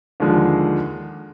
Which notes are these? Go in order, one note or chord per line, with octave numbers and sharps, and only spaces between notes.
D#2 D3 F3 G#3